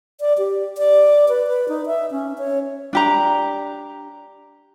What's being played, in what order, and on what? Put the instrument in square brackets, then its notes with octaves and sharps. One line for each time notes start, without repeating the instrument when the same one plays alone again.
[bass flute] D5
G4
D5
B4
B4
D#4
E5
C#4
C#5
[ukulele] D4 G4 A#5